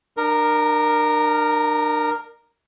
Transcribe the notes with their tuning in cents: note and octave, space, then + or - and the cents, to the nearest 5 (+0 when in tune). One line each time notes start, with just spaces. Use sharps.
D4 +45 A#4 +0